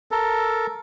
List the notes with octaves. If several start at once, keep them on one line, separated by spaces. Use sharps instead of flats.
A4 A#4